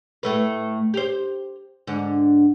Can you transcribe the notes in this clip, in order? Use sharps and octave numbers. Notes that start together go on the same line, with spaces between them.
A2 A3 B4
G4 C5
G#2 D3